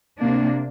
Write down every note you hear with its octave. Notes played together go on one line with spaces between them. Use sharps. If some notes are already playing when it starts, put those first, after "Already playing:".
C3 A#3 D4